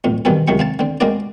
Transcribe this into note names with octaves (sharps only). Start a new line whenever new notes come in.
B1 F2 A2
G2 B2 D#3 E3 C4 A4
C#2 C3 D#3 F#3 C#6
C4 F5 A5
D3 C4
G#3 A#3 C4 F#4 A#4 D5